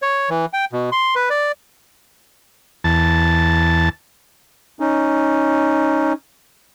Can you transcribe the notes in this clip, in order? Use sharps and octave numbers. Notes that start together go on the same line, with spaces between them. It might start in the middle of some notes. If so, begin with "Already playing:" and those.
C#5
E3
G5
B2
C6
B4
D5
E2 A5
C#4 D#4